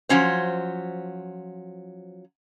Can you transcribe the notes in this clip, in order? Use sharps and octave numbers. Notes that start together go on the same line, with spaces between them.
F3 F#3 C#4 C5